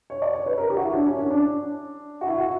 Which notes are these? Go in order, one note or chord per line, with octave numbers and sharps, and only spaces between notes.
C#5
D5
C#5
B4
A#4
G4
F#4
E4
D4
C#4
D4
D4
F#4
E4
F#4